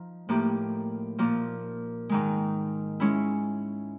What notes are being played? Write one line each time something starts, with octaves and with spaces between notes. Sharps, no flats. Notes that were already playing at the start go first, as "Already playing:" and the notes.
Already playing: F3 D#4
A2 F3 A#3 D#4 G4
A#2 F3 A#3
G#2 D#3 G#3
G#3 C#4 E4